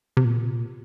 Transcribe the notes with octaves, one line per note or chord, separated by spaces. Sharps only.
C3
A#2